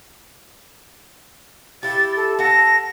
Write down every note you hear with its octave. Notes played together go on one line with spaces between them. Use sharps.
E4 G4 A6
A4
A4 F#5 A5 A#6